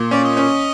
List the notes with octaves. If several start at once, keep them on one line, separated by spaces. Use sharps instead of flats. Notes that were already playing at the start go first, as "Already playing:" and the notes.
Already playing: A#2
C#4 D5
D#5
C#4